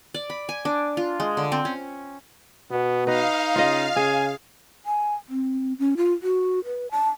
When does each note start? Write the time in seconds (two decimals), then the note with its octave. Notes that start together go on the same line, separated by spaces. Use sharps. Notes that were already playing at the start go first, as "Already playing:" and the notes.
0.14 D5
0.30 B5
0.49 G#5
0.65 D4
0.97 F4
1.20 G#3
1.37 D3
1.52 C4
1.65 C#4
2.71 B2 B3
3.07 D#4 B4 D#5 F5
3.56 C#3 F4 D#5
3.96 C#3 G#4 G#5
4.86 G#5
5.29 C4
5.79 C#4
5.97 F4
6.23 F#4
6.65 B4
6.91 A5